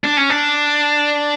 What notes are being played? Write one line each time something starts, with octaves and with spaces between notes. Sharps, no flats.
D4
C#4
D4